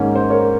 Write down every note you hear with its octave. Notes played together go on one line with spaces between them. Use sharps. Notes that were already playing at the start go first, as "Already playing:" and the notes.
Already playing: G#2 D#3 A#3 C#4
C5
A#4 C#5